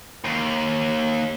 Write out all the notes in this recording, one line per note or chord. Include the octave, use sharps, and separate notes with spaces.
D#2